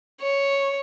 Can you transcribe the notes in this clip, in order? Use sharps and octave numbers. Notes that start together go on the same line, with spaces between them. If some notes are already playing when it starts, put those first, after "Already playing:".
C#5